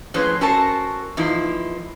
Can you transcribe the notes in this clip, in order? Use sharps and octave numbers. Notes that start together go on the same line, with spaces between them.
A2 F3 G#3 C#4 B4 C5
C#4 F#4 A4 A#4 C5 A5
E2 F3 A#3 D#4 E4